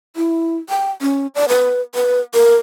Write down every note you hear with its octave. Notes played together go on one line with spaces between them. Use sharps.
E4
G5
C#4
D5
B4
B4
A#4